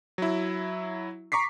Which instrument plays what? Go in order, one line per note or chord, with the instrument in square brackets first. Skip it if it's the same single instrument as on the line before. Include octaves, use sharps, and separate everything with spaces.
[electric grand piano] F#3 E4
A#5 C#6 D6 B6 C7